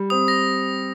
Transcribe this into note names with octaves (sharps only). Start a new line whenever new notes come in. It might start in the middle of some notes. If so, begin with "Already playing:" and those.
Already playing: G3
C4 D#6
A#6